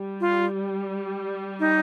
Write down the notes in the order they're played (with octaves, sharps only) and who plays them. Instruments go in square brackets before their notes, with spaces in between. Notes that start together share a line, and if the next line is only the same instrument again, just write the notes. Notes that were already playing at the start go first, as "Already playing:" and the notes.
Already playing: [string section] G3
[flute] F4
D#4